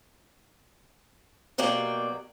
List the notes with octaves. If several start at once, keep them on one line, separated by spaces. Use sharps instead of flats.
B2 F#3 A#3 D5 G5